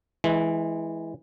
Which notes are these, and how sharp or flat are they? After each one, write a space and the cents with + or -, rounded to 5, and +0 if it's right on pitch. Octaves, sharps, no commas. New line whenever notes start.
E3 -10 G#3 +10